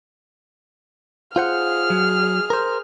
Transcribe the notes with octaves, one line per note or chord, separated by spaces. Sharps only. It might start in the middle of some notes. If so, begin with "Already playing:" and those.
F4 G#4 C5 F#5 F6
F#3
A#4 C5